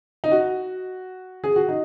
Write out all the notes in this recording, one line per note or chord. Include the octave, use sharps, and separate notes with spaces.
D#4
F#4
G#4
F#4
D#4